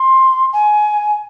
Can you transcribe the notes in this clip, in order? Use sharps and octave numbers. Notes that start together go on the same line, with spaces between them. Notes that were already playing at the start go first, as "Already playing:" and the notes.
Already playing: C6
G#5